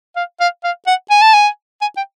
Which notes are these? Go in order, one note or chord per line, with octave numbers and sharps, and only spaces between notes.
F5
F5
F5
F#5
G#5
A5
G#5
G#5
G5